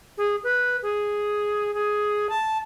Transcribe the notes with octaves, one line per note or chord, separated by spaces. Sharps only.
G#4
B4
G#4
G#4
A5